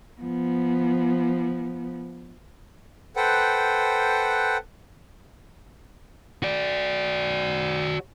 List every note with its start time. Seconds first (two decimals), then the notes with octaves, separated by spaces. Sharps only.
0.20 F3 B3
3.16 A4 B4 C5 F#5 G5
6.43 F#4 D5